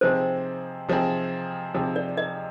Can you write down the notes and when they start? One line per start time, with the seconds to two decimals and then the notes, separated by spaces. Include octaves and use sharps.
0.01 C3 F3 C4 D#4 G#4 C5
0.89 C3 F3 C4 D#4 G#4
1.74 C3 F3 C4 D#4 G#4
1.96 D5
2.17 D#5